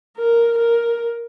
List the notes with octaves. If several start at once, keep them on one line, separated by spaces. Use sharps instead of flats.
A#4
A#4